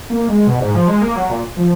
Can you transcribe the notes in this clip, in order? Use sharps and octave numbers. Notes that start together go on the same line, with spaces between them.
A#3
G#3
B2
G#2
F3
G#3
A#3
F#3
A#2
F3